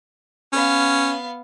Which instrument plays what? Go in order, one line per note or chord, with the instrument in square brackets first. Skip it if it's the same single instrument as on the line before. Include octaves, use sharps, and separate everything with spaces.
[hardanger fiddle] B3 F5 [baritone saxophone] C#4